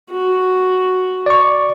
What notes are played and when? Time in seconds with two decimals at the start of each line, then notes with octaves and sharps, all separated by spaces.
0.11 F#4
1.26 D5 C#6